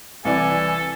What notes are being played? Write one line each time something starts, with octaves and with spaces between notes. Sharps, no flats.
C2 E3 A4 D5 G#5